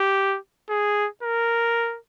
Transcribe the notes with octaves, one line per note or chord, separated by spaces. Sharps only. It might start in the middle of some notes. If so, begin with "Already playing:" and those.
Already playing: G4
G#4
A#4